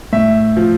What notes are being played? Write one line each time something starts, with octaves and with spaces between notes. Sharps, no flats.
A2 E5
F3